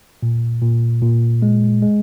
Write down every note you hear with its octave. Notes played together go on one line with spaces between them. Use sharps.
A#2
A#2
A#2
G#3
G#3